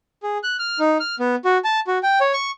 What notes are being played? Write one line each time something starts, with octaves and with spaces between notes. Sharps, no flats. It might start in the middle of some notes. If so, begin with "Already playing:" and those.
G#4
F#6
F6
D#4
F6
B3
F#4
A5
F#4
G5
C#5
C#6